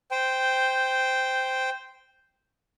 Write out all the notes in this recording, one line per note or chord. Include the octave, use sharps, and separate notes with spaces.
C5 G5